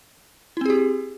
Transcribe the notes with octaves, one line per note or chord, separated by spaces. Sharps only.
C4 E4 G4 G#4